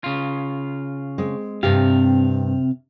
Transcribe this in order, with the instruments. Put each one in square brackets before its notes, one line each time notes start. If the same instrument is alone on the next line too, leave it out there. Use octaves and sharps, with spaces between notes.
[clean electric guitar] C#3 F4
[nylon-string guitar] G#3 C4
[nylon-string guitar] G2 G4 [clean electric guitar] C3 F5 [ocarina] C4